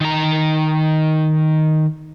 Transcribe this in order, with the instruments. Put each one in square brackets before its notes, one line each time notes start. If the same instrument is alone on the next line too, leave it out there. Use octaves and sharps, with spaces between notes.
[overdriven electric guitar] D#3 A#5